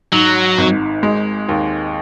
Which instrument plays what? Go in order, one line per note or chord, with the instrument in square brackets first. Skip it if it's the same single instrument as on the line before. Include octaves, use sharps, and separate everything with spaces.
[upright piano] G#2 [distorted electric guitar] F#3
[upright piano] G#1
G#3
D#2